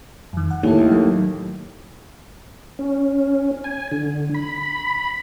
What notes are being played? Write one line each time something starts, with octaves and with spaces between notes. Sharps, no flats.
F2 D#3
F#5
D#2 A2 E4 A4
F#3
C#4
G#5
D3
B5